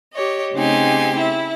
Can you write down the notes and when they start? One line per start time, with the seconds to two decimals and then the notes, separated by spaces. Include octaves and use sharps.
0.13 G4 C#5 D#5
0.53 C#3 A3 C4 D#4 G4 G#5
1.16 E4 E5